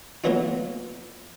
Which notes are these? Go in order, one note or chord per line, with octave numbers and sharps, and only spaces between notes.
E3 F#3 A#3 B3 D#4 F4